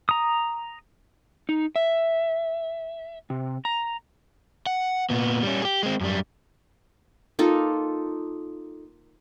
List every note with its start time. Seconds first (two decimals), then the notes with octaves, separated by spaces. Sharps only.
0.09 A#5 D#6
1.49 D#4
1.76 E5
3.30 C3
3.65 A#5
4.66 F#5
5.10 A#2 B3
5.43 G3 C#4
5.62 G4 G#4
5.83 G#3 C4
6.01 F#2 G3
7.39 A#3 D#4 F4 A4